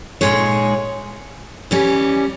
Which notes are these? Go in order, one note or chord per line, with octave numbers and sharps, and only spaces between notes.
A#2 G#3 D#4 G#4 C#5
E3 G3 C#4